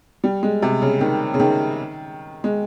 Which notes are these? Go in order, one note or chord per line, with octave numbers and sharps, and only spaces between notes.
G3
G#3
C3
C#3
D#3
C#3
D#3
G#3